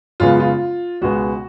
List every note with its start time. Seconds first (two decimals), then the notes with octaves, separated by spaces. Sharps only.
0.20 F#2 C#3 G#3 B3 F4
0.40 F4
1.01 C#2 B2 G#3 B3 F#4